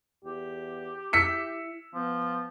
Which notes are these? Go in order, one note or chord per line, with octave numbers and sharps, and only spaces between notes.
E2 G4
E4 E6 B6 C#7
F3 B3